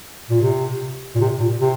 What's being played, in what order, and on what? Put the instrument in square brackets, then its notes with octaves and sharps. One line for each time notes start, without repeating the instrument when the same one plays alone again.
[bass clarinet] A#2
C3
A#2
C3
A#2
C3